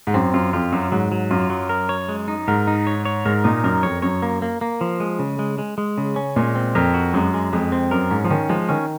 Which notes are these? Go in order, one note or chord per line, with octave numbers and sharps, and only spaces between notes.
G#2
F#2 C4
F#2 F4
F2 F4
F#2 F#3
G#2 F#3
F#3
F#2 F4
F#3
A#4
C#5
G#3
D#4
G#2 A#4
D#4
C#5
C#5
G#2 A#4
A#2 D#4
F#2 A#4
F2 C#5
F#2 C#5
A#3
A#3
A#3
F3
G#3
C#3
G#3
G#3
G#3
C#3
C#4
A#2 G#3
C4
F2 A#4
F#4
F#2 G#3
G#3
F2 G#3
C4
F#2 A#4
G#2 C#4
F3
D#3 C#4
F3 G#3
D#3 C#4